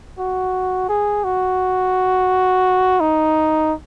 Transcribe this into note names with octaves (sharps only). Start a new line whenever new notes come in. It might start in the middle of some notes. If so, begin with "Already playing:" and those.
F#4
G#4
F#4
D#4